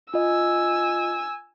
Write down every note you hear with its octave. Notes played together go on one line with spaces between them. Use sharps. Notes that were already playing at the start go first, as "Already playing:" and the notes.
F4 D#5 G#5 E6